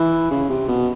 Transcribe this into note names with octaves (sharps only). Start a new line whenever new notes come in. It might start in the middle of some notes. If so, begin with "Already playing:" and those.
Already playing: E3
C#3
C3
B2